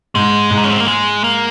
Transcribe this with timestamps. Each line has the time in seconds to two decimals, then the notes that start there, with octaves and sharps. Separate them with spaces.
0.15 G#2 G#3
0.51 G#2
0.57 D#4
0.65 C#4
0.71 C4
0.80 A#3
0.88 G#3
1.24 A#3